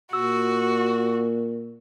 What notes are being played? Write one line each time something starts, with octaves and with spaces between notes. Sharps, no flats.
A#2 F#4 E6